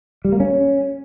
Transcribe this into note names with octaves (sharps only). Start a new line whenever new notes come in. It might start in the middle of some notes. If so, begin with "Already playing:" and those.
G3
A#3
C#4